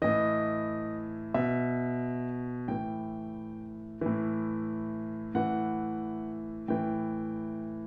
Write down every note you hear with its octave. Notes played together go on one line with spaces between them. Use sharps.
A2 E3 D#5
B2 E5
A2 E3 G5
A2 E3
A2 E3 F#5
A2 E3 G5